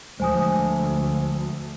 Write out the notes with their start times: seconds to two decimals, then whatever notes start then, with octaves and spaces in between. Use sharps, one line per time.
0.20 D2 F3 G#3 C5 G#5 D#6